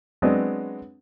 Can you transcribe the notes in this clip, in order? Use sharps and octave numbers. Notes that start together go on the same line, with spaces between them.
F#3 G#3 B3 C4 D4 D#5